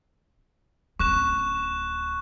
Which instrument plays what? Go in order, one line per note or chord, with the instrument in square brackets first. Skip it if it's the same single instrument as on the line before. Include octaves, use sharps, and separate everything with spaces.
[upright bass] D1 C#4 [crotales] C#6 F#6 E7